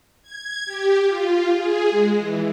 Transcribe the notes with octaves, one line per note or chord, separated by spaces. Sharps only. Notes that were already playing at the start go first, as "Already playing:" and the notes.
G#6
G4
F4
G#4
G#3
E3